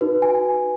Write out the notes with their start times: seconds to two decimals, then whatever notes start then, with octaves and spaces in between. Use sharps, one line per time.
0.01 D#4 F#4 B4
0.22 G#5